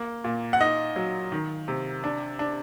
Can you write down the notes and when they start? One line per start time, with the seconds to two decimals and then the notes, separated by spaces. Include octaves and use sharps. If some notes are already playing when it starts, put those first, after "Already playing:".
Already playing: A#3
0.24 A#2
0.53 F#5
0.60 D#4 D#5
0.96 F#3
1.32 D#3
1.68 C3
2.04 D4
2.39 D4